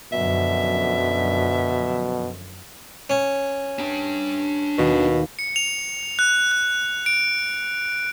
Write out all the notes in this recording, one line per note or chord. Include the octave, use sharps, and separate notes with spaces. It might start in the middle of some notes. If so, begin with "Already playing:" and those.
F#2 B2 D3 F3 E5
C#4
D4 G5
D#2 B2
C#7
F7
F#6
F#6
D7